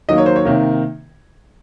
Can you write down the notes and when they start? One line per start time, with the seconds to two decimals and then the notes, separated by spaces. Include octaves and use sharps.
0.09 D#3 F#3 A#3 D#5
0.18 C#5
0.26 C5
0.36 C#5
0.45 C3 D#3 A#3